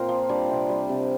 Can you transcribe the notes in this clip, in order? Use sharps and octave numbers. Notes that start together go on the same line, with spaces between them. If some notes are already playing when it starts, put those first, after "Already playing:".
Already playing: A#2 A#3 C4 F4 A#4 C5
F3
G3 D4 D5
C3
G3
C3